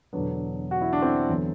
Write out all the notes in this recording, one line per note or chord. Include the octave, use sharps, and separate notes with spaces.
E1 E2 D3 F#3 B3 D4
F#4
E4
D4
C4 E4
E2 D3 F#3